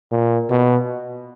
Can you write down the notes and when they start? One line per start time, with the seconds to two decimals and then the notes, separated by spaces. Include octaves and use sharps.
0.12 A#2
0.50 B2